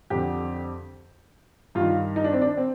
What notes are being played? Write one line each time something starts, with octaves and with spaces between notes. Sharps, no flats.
F2 D3 G4
G2 D#3 F4
D#4
D4
C4
D4
C4